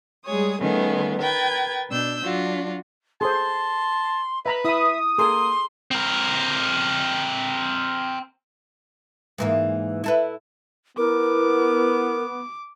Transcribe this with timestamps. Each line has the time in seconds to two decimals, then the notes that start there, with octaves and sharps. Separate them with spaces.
0.24 G3 G#3 G#4 C#5 D#6
0.60 D#3 G3 A3 B3 C#4 G#4
1.19 A#4 B4 G5 G#6 A6
1.89 B2 D4 E6 G6
2.22 F#3 D4 F4 F#4
3.21 G#4 A4 C5 A5 C6
4.46 B4 E5 A#5 B5
4.65 E4 E5 B5 D#6
5.18 A#3 G#4 A4 C6
5.91 C4 A#4
9.38 G#2 E3 A#3
10.04 E4 A4 B4
10.98 B3 E4 A#4 D6